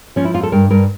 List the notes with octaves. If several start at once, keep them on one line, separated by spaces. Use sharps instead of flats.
F3 C#4
E4
F2 F4
A4
G2 A#4
G2 A#4